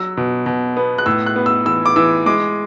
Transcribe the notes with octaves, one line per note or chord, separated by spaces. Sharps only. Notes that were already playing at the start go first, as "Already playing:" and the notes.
Already playing: F#3 E6
B2
B2
B3
F#6
A2 E6
F#6
B3
E6
E3 E6
D6
E3 E6
G#3 D6